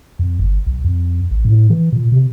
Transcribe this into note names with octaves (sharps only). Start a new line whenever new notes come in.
F2
G1
B1
F2
A1
A2
E3
A#2
C3